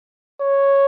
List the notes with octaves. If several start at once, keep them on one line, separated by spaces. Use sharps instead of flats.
C#5